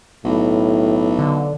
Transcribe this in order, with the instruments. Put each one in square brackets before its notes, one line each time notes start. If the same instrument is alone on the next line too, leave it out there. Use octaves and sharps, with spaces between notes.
[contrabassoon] B1 [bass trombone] A2
[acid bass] D3